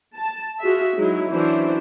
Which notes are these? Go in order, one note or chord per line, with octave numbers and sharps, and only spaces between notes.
A5
F4 F#4 G#4 E5
F#3 G#3 D#4 E4
E3 F#3 C#4 D4 E4 C5